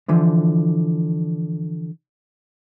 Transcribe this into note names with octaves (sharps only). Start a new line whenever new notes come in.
D3 E3 F3